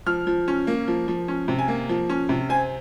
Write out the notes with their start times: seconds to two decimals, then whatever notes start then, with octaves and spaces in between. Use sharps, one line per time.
0.06 F3 F6
0.27 F3
0.48 C#4
0.67 A#3
0.88 F3
1.08 F3
1.28 C#4
1.48 C3
1.59 G#5
1.68 A#3
1.89 F3
2.09 C#4
2.29 C3
2.49 C4 G#5